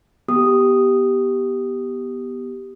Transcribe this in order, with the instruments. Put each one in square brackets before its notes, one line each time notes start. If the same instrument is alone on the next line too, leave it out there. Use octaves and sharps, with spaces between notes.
[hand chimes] B3 G4 D#6